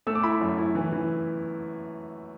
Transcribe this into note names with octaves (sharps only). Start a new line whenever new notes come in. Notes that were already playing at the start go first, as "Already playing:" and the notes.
A3 E6
D6
E4 B5
F#2
E4
E3
E3